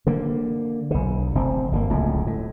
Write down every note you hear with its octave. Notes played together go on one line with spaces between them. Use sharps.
D3 A#3
B1 D3
F1 C4
G1 C3 A#3
D1 C#2 A2
A2